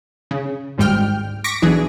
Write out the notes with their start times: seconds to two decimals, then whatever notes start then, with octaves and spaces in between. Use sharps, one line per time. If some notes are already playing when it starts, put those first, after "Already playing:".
0.31 C#3
0.78 G#1 D2 G#2 G3 G5 F6
1.44 C#6 D6 A#6 B6 D7
1.62 B1 E3 D4 G#4